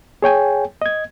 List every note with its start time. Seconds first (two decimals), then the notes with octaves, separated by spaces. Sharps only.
0.22 G#4 C#5 G5 G#5
0.82 D#5 G#6